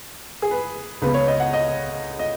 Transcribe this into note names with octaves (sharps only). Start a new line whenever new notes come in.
G#4
B4
C#2 C#3 B3 B4
C#5
D#5
F#5
D#5
D#5